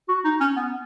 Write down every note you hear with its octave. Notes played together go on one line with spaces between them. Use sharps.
F#4
D#4
C#4
B3